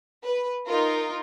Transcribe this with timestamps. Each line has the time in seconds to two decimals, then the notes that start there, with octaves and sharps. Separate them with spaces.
0.24 B4
0.67 D#4 F4 A#4